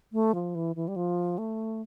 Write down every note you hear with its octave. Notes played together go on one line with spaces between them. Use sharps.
A3
F3
E3
E3
G3
F3
A3